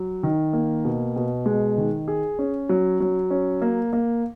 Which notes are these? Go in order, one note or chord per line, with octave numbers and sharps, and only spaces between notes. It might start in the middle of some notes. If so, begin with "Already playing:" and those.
Already playing: F#3
D#3
A#3
B2
B2
G#3
D#3
G#4
C#4
F#3
F#3
C#4
A#3
A#3